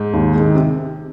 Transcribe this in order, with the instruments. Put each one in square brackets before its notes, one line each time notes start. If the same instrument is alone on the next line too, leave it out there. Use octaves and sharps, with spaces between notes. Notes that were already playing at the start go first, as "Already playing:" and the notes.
Already playing: [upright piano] G#2
[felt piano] D#2
D#3 G#3
[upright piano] C3